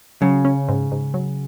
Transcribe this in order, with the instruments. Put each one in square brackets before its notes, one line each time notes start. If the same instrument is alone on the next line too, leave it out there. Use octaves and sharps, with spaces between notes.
[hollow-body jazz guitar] C#3 [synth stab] F#3
[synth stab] C#4
G#2
G#2
F#3